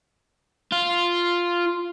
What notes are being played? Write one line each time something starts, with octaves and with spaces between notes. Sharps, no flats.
F4